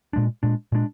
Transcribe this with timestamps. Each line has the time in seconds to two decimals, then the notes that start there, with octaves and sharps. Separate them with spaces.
0.13 A#2 G#3 D4
0.43 A#2 G#3 D4
0.72 A#2 G#3 D4